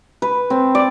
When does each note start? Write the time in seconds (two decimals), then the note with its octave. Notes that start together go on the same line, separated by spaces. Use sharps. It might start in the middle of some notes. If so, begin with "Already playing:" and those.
0.22 B4
0.50 C4
0.75 D5